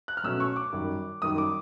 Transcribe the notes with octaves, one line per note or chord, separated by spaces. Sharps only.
F#6
F6
B2 F#3 A3 C#4 E6
C#6
D6
F#2 D#3 G3
F#2 D#3 G3 D#6
D6